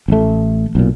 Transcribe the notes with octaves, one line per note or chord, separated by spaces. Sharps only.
A1 A3
B1 A#2